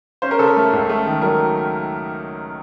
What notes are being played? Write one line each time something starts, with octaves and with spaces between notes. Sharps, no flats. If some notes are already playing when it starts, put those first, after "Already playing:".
C#4 C5
A#4
C#3 A4
A#4
A3
C#2
A3
D#3
F#3 A#4